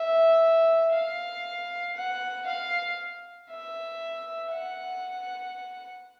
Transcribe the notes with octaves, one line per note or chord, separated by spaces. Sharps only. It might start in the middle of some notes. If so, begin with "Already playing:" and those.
Already playing: E5
F5
F#5
F5
E5
F#5